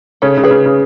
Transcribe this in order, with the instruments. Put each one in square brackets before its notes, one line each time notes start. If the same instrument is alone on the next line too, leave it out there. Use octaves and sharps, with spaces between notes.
[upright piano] C#3 [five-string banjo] A4 C#5
[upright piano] C#3
[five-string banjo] G#4 B4
[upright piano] C#3
C#3